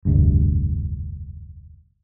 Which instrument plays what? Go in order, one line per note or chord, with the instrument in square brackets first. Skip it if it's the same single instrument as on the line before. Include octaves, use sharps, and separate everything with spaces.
[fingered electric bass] F1 D2 G2